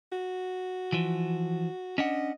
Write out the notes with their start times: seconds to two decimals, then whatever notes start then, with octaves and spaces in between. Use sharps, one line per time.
0.12 F#4
0.92 E3 F3
1.98 C#4 D4 D#5 F#5